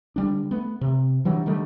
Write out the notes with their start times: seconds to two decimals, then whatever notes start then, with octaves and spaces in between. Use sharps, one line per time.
0.16 D3 G3 D4
0.51 A3 B3
0.81 C3
1.25 E3 F#3 G3 D4
1.46 D3 D#3 G3 A3